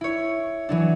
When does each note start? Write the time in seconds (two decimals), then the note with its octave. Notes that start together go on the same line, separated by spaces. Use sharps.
0.01 E4 C#5
0.69 E3 F#3 D4